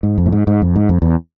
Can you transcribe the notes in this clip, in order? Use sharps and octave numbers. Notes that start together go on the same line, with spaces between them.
G#2
F2
A2
G#2
G#2
F2
G#2
F2
E2